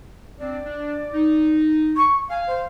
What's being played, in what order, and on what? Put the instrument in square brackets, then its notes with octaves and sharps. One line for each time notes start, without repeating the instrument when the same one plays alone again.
[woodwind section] C4 D4 [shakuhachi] D5
[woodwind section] D4
D#4
[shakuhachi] C#6
[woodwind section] F5 [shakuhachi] G#5
[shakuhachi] C5